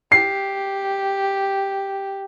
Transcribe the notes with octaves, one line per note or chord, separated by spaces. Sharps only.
G4 C7